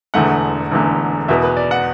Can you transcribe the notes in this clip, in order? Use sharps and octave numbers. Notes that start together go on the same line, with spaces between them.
E1 E2 D3 A3 F#5
E1 E2 D3 A3
E2 B2 B3 E5
B4
D5
F#5